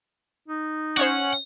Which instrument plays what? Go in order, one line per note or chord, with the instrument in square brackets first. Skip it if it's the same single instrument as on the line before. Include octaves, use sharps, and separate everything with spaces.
[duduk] D#4
[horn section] C#4 [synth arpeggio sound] C5 C#5 C#6 [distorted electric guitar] F#5